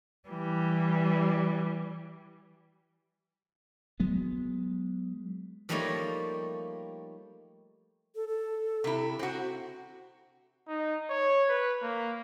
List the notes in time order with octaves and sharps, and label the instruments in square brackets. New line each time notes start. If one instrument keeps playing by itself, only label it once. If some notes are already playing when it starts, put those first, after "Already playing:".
[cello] E3 G3
[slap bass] F#3 G#3 B3
[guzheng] F3 G3 A3 A#3 D#4 C#5
[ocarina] A4
A4
[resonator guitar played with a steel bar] C3 E4
C4 F#4
[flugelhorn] D#4
C#5
B4
A#3